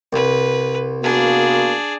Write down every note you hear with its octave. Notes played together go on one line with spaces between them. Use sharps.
C2 B4
A#3 B3 D4 F#4 G#4